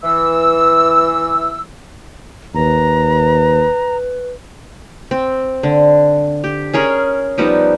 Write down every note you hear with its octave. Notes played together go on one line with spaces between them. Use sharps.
E3 E6
D#2 B4 A#5
C4
D3
G4
C#4 G#4 A#4 C#5
F3 G3 B3 D#4